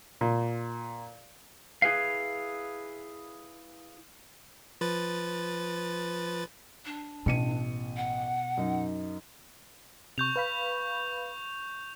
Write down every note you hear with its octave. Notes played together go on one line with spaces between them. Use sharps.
A#2
E4 G#4 B4 F5
F3 B4 A6
D4
A1 B2 C#7 D#7
F#5
F#2 D#4
C3 C#6 G6 F7
B4 F5 B5